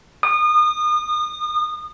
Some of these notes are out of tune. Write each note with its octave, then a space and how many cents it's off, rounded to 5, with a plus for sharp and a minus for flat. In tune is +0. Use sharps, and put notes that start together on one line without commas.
D#6 -30